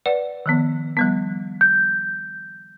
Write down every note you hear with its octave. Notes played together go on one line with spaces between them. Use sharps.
B4 D5 F#5
D#3 F3 B3
F3 G3 B3
G6